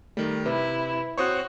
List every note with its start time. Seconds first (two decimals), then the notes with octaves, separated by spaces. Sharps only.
0.17 D#3 G3 A3
0.46 C3 E4 B4
1.18 C4 F#4 C5 C#5 C#6 D#6 F#6